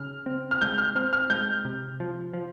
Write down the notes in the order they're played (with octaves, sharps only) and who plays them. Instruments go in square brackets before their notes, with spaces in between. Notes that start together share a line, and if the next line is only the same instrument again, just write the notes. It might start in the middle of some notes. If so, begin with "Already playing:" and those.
Already playing: [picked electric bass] C#3 [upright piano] F6
[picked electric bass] C4
[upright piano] F6
[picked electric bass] G#3 [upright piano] G6
[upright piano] F6
[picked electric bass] C4 [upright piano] F6
[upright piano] F6
[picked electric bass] G#3 [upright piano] G6
[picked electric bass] C3
F3
F3